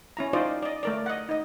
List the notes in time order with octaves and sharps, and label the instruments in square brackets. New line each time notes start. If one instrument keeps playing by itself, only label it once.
[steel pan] C#4 E4 A#5
D#4 F4 C5 D5 D#5
D5 D#5
A3 A#4 D5
D#5 F#5
D#4 D#5